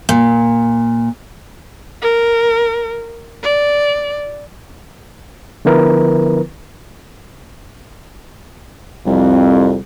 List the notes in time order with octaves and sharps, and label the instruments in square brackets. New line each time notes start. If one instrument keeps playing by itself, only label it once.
[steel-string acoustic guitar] A#2
[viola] A#4
D5
[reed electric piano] D3 F3 B3 E4 A#4 B4
[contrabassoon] C2 [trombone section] F2